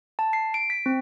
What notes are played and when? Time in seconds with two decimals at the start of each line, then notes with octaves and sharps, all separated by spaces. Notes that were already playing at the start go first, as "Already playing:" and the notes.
0.19 A5
0.33 C7
0.54 D7
0.70 B6
0.86 C4